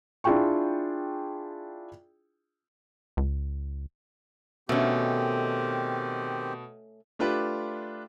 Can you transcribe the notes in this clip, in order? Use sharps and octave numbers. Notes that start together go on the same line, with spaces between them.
D4 E4 F4 G#4 G5 C#6
C#2
B2 D#3 A3 C4 C#4 G4
A3 D4 F4 G4 B4